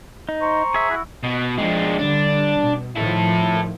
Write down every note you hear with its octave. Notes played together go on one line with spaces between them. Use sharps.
D#4
C5 A#5 C#6
G#4 E5
E4 F#4
B2
F3 G#3 D4
D3 G3 D4
B2
A2 D#3 F3 E4 A4